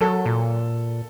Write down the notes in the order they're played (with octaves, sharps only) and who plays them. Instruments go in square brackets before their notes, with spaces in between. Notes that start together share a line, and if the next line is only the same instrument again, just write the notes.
[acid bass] F#3 [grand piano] A4
[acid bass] A#2